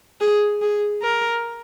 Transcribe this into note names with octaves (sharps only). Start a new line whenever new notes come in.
G#4
G#4
A#4